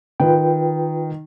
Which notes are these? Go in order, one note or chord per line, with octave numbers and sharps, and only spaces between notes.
D#3 F4 B4 G5